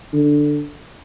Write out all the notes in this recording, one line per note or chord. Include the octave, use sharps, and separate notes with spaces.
D3